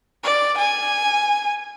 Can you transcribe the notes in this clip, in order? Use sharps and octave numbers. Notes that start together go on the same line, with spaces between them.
D5
G#5